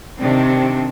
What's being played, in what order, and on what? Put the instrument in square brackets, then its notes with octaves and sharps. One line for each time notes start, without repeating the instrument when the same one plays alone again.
[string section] C3 D#3 D4 [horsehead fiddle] C4